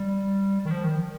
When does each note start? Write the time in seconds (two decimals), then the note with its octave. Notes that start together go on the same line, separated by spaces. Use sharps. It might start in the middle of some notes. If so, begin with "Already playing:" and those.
Already playing: G3
0.65 D#3
0.71 F3
0.84 D#3